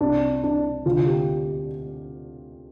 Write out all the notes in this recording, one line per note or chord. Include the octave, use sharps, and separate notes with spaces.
C2 C3 D4
D4
D2 C3 F4
G4